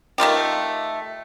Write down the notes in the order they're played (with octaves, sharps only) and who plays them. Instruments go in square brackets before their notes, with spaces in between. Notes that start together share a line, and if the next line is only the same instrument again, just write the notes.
[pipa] D#3 A3 F4 G4